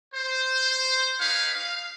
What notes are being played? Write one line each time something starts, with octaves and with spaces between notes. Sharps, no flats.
C5
D#4 G4 B4 C#5 F5
F5